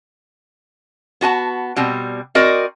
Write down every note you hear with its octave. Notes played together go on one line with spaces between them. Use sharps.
B3 F#4 G#5 A5
B2 G3 C4
C4 F#4 A#4 D5 D#5